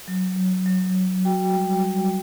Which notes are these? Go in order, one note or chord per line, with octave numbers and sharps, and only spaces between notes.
F#3
F#3
F#3
F#3
F#4 G5
G3
G3